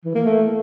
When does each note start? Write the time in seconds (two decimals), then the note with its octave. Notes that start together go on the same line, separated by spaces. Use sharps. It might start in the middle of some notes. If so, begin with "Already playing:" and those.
0.05 E3
0.15 A#3
0.26 A3